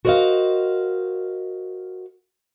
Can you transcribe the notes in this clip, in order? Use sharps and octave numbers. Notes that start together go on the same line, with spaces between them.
F#4 A#4 C5 D5 D#5 F5